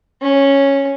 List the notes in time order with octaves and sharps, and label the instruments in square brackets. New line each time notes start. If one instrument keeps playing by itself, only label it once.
[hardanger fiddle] C#4